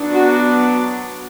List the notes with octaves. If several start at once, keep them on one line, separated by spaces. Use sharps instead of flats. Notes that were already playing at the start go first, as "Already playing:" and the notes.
Already playing: F#3 B3 D4
F#4